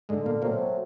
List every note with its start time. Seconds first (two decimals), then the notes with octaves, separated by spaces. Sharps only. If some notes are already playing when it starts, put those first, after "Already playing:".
0.09 G#2 D3 G#3
0.26 A#2 A#3
0.42 A#2 F#3 A3 A#3 C4